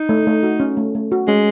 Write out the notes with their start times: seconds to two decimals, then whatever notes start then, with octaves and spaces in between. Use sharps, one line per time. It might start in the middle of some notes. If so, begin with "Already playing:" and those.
Already playing: D#4
0.09 A3
0.27 A3
0.43 F#4
0.60 C#4
0.77 A3
0.95 A3
1.12 F#4
1.28 G#3 C#4